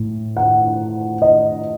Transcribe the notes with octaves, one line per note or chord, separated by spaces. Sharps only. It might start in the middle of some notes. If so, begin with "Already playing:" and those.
Already playing: A2
F#5
D#5